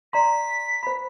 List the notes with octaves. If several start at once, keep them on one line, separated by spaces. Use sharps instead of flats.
D5 A#5 C6 B6
C5 B5